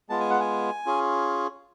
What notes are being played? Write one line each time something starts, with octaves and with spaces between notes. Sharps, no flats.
G#3 B3 F4 A5
G#5
F#5
G#5
C#4 F4 G#4